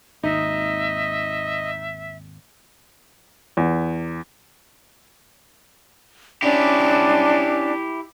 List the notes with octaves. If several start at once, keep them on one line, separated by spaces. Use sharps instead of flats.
G#1 D#2 D#4 D#5 E5
E2
C#4 D4 E4 G4 A5